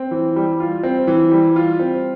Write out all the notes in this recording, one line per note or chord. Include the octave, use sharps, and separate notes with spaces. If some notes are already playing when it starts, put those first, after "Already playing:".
Already playing: C4
E3
G3
F4
C4
E3
G3
F4
C4